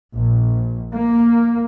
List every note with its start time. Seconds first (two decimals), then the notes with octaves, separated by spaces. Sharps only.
0.15 A#1
0.93 A#3